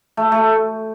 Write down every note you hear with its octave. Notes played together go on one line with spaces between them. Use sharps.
A3
A3